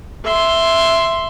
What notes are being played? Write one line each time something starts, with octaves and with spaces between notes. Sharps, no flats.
E5 C6